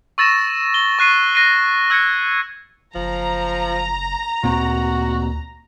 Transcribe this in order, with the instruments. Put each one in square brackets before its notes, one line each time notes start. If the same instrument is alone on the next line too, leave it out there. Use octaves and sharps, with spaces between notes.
[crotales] C#6 E6 A6 A#6 E7
G7
C#6 F#6 C7 D#7
F#6 A#6 C7 D#7
E6 F#6 G#6 A#6 C#7
[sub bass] F#1 [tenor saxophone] F3 [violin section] A#5
[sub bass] D2 [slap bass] A#2 C4 [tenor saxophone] F#4